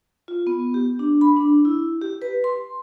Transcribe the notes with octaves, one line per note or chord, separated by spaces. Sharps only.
F4
B3
G4
D4
B5
D4
E4
G4
B4
C6